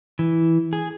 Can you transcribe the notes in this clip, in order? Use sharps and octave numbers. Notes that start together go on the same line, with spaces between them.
E3
G#4